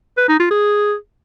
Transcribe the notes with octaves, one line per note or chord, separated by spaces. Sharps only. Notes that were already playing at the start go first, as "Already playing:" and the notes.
B4
D#4
F4
G#4